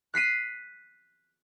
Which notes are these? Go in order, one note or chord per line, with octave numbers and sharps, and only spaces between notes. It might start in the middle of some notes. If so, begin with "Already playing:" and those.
F#6 B6 C7 D#7